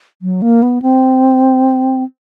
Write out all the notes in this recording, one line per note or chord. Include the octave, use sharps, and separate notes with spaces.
F#3
A#3
B3
C4